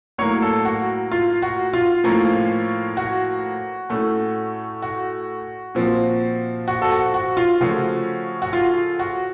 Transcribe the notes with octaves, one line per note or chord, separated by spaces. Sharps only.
A2 F#3 A#3 C#5
A4
F#4
F4
F#4
F4
A2 F3 A#3 C#4
F#4
A2 A3 C#4
F#4
A#2 F3 C4
F#4
A4
F#4
F#4
F4
C#3 F3 A3 C#4 F#4
F#4
F4
F#4